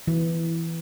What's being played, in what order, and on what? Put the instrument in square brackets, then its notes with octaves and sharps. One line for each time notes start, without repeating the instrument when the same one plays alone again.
[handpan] E3